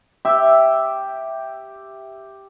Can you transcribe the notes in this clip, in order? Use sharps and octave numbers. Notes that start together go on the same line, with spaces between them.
G4 E5